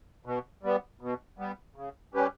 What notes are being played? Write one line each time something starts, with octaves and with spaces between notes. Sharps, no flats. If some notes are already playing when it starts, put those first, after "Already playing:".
B2
G3 B3
B2
G3 B3
C#3
G3 C#4 G4 B4